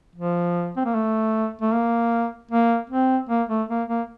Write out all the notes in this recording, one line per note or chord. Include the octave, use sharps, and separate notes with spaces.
F3
C4
A#3
A3
A3
A#3
A#3
C4
A#3
A3
A#3
A#3